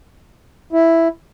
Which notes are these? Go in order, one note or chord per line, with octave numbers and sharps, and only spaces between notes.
E4